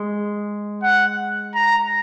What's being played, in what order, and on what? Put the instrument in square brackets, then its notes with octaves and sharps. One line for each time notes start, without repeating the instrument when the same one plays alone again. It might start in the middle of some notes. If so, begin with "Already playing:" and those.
Already playing: [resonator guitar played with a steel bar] G#3
[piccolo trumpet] F#5
A#5